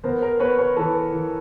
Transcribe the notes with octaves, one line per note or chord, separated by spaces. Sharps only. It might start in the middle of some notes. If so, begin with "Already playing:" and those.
B3 A#4 C5
A#4 C5
B3 B4 C#5
B4 C#5
E3 A4 B4
E3